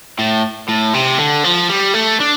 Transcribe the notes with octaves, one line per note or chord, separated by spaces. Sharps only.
A2
A2
C3
D3
F3
G3
A3
D4